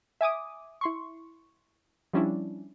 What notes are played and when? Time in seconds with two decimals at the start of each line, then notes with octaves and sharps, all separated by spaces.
0.21 E5 G#5 D6 D#6
0.81 E4 C6 C#6
2.13 F3 G3 C#4 D4 E4